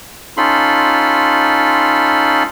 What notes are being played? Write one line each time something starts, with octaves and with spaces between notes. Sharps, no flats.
C#4 D#4 F4 A4 B5 C6